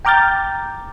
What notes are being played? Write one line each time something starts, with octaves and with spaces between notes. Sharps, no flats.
G5 A#5 D6 F6 G6 A6